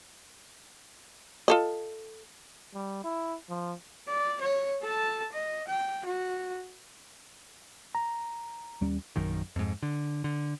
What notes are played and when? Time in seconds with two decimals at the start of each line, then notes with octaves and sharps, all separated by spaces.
1.48 F4 A4 D#5
2.73 G3
3.04 E4
3.49 F3
4.08 D5
4.41 C#5
4.82 A4 A5
5.32 D#5
5.68 G5
6.06 F#4
7.95 A#5
8.81 D#2 G3 C#4
9.16 A#1 F#2 D#3
9.56 F2 G#2
9.82 D3
10.24 D3